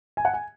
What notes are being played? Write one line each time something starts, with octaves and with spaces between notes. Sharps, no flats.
G#5
F#5
G#5